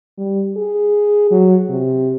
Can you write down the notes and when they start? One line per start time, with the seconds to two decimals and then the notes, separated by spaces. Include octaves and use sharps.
0.18 G3
0.57 G#4
1.31 F#3
1.70 C3